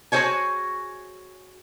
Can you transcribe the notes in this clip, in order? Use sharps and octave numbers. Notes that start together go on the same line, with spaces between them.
F#4 G#4 A4 C5 C#5 G#5